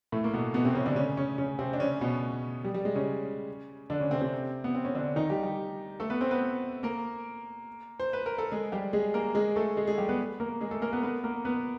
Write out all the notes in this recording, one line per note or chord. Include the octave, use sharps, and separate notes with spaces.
A2 A3
A#3
B2 B3
B2 B3
C3 C4
C#3 C#4
D3 D4
C#3 C#4
C#3 C#4
C#3 C#4
C3 C4
D4
C#3 C#4
B2 B3
G3
G3
G#3
C#3 C#4
D3 D4
C#3 C#4
C3 C4
C3 C4
B3
C4
C#4
D3 D4
D#3 D#4
G3 G4
G3 G4
A3 A4
B3 B4
C4 C5
B3 B4
A#3 A#4
C5
B4
A#4
A4
G#3 G#4
G3 G4
G#3 G#4
A#3 A#4
G#3 G#4
A3 A4
G#3 G#4
G#3 G#4
G3 G4
B3 B4
A#3 A#4
G#3 G#4
A3 A4
A#3 A#4
B3 B4
B3 B4
A#3 A#4
B3 B4